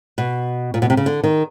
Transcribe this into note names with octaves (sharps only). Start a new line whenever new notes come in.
B2
A#2
B2
C3
C#3
D3
D#3